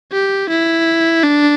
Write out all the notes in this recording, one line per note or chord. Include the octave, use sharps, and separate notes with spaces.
G4
E4
D4